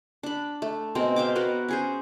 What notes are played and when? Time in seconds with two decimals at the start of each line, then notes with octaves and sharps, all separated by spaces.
0.23 D4 B5
0.62 A3
0.95 B2 G#3 C4 A#4
1.16 E5 F5 G5 D6
1.36 B3 F#4 A#4 B4
1.68 C#4 G#4 C5